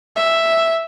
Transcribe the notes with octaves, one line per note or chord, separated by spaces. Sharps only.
E5